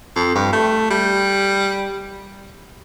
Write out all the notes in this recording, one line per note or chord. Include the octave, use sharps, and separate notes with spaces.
F2
G2
A3
G3